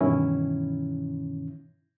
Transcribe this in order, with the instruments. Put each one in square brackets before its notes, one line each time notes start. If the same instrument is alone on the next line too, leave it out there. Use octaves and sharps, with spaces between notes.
[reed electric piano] G2 B2 D#3 E3 C#4 E4